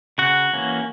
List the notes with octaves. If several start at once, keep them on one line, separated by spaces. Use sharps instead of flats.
C#3 F#4 F#5
E3 A#3 C#4